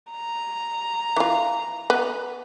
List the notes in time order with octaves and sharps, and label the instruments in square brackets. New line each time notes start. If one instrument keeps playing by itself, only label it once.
[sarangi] A#5
[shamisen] E3 F4
B3